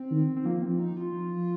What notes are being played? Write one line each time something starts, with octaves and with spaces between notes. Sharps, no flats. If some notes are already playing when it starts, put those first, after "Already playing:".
Already playing: C4
D#3
C4
F3 A#3
C4
D#4
F4
F3